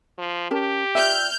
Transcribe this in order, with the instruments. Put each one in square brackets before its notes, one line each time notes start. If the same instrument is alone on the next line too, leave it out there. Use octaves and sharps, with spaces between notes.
[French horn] F3
[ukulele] C#4 A#4 A5 [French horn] G4
[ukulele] F4 D5 G5 [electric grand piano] E5 [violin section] F6 G6